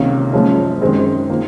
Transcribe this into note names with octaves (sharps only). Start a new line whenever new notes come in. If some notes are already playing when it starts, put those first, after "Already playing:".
Already playing: C#2 C3 D#3 A#3 C#4
F#1 F#2 F3 G#3 C#4
F#2 D#3 G#3 C4
D#3 A#3 F4